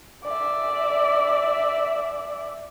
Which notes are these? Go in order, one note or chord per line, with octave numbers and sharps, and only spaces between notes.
D5 E5